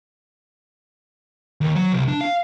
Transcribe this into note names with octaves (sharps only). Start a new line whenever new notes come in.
D#2
F#3
C2
D4
F5